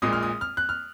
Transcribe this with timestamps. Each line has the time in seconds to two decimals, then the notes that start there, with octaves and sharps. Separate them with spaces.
0.02 A#1 A#2 G#3 D#6
0.13 F6
0.23 D#6
0.41 F6
0.57 F#6
0.69 F6